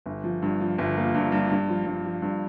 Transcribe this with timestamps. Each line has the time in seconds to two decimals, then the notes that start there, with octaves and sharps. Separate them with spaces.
0.06 G1
0.24 F3
0.42 G2
0.60 F3
0.78 G1
0.97 A#3
1.14 G2
1.32 G2
1.50 G2
1.69 F3
1.86 G2
2.04 F3
2.22 G2